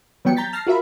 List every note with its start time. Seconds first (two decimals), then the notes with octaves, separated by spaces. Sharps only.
0.25 E3 F#3 G3 B3 G5 C#7
0.37 A#5 G6 A6 B6
0.52 A5 F6 A6 A#6 C7
0.67 F4 F#4 A#4 E5 F5 B5